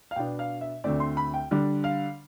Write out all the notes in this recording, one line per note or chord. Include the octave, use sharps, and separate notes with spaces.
F5
B2 B3 D4 G5
F5
E5
D2 D3 A3 C4 D5
C6
B5
G5
D3 G3 D4
F5